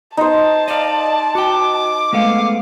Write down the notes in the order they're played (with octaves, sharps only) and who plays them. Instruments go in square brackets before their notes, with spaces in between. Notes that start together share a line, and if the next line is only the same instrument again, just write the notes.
[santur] D#4 C5 [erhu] A5
[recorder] D5 [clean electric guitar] D#5 F5
[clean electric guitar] F#4 G5 [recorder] D6
[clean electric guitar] G#3 A3 B3 [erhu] F5